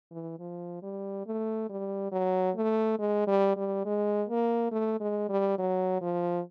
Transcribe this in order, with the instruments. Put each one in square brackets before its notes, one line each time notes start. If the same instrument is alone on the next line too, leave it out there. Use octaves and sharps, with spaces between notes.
[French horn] E3
F3
G3
A3
G3
F#3
A3
G#3
G3
G3
G#3
A#3
A3
G#3
G3
F#3
F3